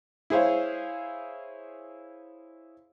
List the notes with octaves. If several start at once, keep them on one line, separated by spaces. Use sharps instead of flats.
E4 G#4 C5 C#5 F5